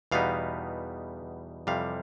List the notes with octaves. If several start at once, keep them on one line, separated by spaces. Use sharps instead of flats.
E2 B2 G3 B3 D#4 F5
F2 C3 E3 G3 F5